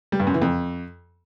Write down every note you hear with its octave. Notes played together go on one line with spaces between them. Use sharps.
G3
G2
F#2
E3
F2